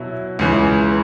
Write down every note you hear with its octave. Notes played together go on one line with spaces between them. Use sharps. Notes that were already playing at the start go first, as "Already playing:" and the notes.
Already playing: B2 F#3 E4
C#2 C#3 E3